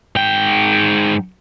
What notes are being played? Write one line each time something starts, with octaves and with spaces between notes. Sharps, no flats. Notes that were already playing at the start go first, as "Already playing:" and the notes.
G#2 G5